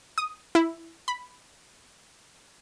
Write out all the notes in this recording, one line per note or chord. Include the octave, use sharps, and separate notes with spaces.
D#6
E4
B5